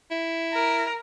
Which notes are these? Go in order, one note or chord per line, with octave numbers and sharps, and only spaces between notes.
E4
A#4